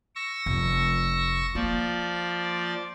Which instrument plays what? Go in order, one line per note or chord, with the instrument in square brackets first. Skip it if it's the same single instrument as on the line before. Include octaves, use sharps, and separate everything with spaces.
[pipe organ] C#6 E6 A#6
[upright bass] F1
[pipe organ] F3 D5 [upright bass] A#3